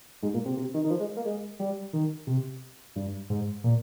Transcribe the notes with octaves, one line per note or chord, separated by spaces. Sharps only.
G#2
A#2
C3
C3
D#3
D#3
F3
G#3
A#3
G#3
G3
D#3
C3
G2
G#2
A#2